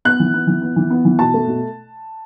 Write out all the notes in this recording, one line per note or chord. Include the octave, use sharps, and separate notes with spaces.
B3 F#6
E3
B3
E3
B3
E3
B3
E3
B2 A5
A3
B2